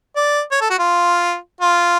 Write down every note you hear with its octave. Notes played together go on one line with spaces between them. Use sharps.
D5
C#5
A4
F#4
F4
F4